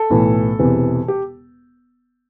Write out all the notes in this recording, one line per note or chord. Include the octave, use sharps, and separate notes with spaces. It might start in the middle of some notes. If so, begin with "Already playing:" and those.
Already playing: A4
B1 A2 E3
E1 E2 C3 E3
G4